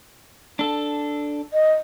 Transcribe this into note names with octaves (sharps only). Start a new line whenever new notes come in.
D4 A4
D#5